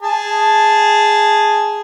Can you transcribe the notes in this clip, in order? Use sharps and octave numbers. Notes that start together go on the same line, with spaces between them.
G#4 A5